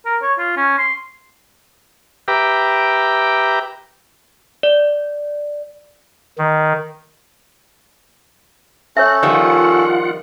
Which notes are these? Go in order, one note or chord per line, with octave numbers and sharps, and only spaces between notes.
A#4
C#5
F4
C#4
C6
G4 B4 E5 G5 A#5 D6
D5
D#3
C#4 A4 C#5 E5 F#6
D#3 F3 G3 F4 D5 F#5